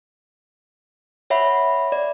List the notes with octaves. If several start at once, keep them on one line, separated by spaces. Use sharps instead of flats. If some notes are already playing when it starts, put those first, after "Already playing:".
C#5 E5 F#5 B5
D5